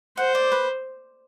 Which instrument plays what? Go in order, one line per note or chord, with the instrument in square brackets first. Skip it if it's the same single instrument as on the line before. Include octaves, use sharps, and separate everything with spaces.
[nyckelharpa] C5 [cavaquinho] F#5
[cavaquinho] D5
B4